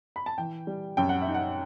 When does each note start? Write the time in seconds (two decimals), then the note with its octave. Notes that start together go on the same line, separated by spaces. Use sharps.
0.16 B5
0.26 A5
0.38 E3 G5
0.67 G3
0.97 F#2 G5
1.09 F#5
1.22 E5
1.28 D#4
1.34 F#5